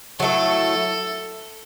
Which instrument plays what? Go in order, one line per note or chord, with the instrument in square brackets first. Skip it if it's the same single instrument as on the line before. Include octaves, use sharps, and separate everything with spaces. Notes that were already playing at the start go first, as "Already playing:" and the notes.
[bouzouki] F#3 A3 E4 [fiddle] A4